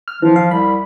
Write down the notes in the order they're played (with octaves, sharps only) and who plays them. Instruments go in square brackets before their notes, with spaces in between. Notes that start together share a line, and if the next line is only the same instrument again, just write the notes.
[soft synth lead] F6
[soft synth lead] E3 [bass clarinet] F3
[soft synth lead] F5
[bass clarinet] C2 [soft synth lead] B5